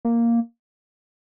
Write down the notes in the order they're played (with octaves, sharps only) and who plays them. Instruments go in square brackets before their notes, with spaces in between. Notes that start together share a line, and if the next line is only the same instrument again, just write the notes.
[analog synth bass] A#3